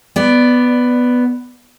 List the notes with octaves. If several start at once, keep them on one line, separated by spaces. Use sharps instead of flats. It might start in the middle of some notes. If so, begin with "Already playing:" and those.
B3 D5